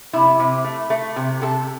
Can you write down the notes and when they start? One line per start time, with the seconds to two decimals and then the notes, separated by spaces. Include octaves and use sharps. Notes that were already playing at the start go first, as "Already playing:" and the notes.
0.13 C3 E4
0.40 C3
0.64 A3
0.90 A3
1.16 C3
1.42 C3 A4